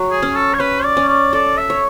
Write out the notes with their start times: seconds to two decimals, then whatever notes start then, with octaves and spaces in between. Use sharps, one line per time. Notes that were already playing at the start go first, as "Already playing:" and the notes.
Already playing: F#3
0.11 G#4
0.23 C#4
0.36 A4
0.54 C#5
0.60 C#4 B4
0.84 D5
0.97 C#4
1.08 D5
1.33 A4 D5
1.58 E5
1.70 C#5